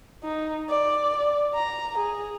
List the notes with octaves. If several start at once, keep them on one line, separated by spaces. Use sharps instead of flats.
D#4
D5
A#5
G#4